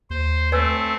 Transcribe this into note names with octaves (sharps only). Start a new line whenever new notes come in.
D#2 C5
A3 C4 B4 C#5 G#5 E6